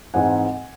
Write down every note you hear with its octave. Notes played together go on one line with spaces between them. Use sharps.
G#2 E3 G#3 C4 D#4 F#5 G#5